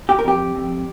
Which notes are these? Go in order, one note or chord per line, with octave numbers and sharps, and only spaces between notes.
G4
A#4
F2 G4
F2